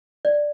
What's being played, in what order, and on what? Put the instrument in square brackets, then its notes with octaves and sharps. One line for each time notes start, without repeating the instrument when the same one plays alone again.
[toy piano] D5